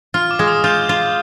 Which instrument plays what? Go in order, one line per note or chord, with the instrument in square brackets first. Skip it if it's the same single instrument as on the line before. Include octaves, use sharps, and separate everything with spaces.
[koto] F4 [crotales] F6
[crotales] D6
[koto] G#3
[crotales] D#6
[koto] F4 [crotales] G6
[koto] F4